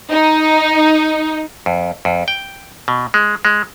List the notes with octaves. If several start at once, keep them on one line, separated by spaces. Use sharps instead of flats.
D#4
F2
F2
G5
B2
G#3
G#3